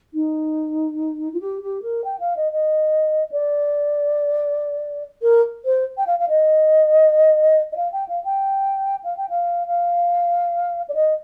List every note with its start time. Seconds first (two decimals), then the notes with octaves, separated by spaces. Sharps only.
0.14 D#4
1.33 F4
1.40 G4
1.62 G4
1.82 A#4
2.04 G5
2.19 F5
2.36 D#5
2.52 D#5
3.31 D5
5.22 A#4
5.65 C5
5.97 G5
6.06 F5
6.19 F5
6.28 D#5
7.72 D#5
7.76 F5
7.92 G5
8.08 F5
8.24 G5
9.03 F5
9.17 G5
9.29 F5
9.67 F5
10.88 D5
10.94 D#5